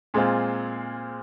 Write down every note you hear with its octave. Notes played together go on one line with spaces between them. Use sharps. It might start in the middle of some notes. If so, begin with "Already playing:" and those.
A#2 G#3 C4 F4